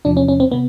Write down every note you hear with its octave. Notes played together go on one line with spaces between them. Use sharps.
E2 C3 F3 D4
C#4
C#4
C4
C3 B3